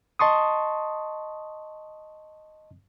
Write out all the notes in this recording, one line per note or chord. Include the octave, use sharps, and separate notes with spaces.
D#5 A5 C6 C#6 D#6